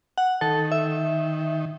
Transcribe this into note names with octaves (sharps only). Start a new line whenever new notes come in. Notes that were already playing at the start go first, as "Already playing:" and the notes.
F#5
D#3 A4
E5